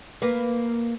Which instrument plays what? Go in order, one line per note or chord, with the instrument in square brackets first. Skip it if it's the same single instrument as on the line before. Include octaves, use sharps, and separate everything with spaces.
[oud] A#3 B4